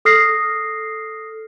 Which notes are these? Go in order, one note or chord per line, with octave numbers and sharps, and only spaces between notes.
A4 D#6 F6 A#6 C7